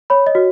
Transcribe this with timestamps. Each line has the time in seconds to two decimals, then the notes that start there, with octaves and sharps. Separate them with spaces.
0.10 C#5 B5
0.27 D#5
0.35 F#4